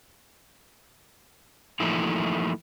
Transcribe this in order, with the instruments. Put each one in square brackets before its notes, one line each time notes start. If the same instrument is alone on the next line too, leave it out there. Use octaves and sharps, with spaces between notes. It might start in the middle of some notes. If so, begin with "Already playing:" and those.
[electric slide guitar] E3 F3 A3 A#3 D#4 E4